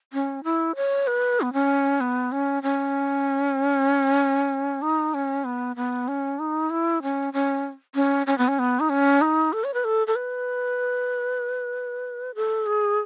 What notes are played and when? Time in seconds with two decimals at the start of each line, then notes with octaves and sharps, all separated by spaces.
0.13 C#4
0.44 E4
0.76 C#5
1.07 B4
1.41 B3
1.53 C#4
2.01 B3
2.32 C#4
2.63 C#4
4.82 D#4
5.14 C#4
5.45 B3
5.76 B3
6.08 C#4
6.39 D#4
6.70 E4
7.02 C#4
7.33 C#4
7.95 C#4
8.27 C#4
8.38 B3
8.48 C#4
8.59 B3
8.80 D#4
8.90 C#4
9.21 D#4
9.53 A4
9.64 C#5
9.74 B4
9.84 A4
10.07 A4
10.16 B4
12.35 A4
12.66 G#4